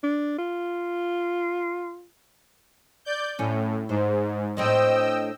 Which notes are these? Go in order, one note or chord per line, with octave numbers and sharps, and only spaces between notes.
D4
F4
D5 G6
A2 C#4
G#2 C5
A2 C4 D4 D#5 G5 E6